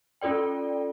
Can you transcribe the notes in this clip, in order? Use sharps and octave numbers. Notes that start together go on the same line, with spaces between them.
C#4 F4 A4 D5 G5